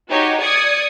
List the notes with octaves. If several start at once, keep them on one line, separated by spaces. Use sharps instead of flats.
D#4 F#4 G4 C#5
D5 D#6 G#6 C#7